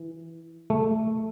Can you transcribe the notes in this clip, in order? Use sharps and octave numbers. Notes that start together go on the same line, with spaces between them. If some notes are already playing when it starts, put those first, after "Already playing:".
Already playing: E3
A3